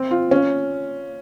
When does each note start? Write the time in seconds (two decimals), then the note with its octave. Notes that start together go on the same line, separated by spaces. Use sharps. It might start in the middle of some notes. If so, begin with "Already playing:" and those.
Already playing: C4
0.11 F4
0.31 C#4